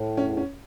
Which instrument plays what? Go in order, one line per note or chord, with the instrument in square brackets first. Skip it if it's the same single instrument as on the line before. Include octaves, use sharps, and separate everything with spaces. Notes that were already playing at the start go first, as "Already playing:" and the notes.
Already playing: [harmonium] A2
[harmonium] E2 [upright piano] C#4
[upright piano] C#4